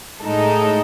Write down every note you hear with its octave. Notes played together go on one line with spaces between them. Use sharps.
A2 G#3 D#4 A4